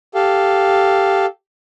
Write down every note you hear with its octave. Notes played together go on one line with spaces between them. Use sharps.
G4 A4 F5